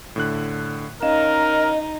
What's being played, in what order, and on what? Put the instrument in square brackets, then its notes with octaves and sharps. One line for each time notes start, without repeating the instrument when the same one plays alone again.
[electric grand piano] A2 D3 F#6
[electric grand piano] C#4 F5 E7 [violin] D#4 [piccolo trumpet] A#4 [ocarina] D#5